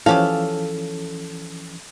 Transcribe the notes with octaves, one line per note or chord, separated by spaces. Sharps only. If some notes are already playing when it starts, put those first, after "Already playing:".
C#3 E3 F3 C#4 G4 A4 F5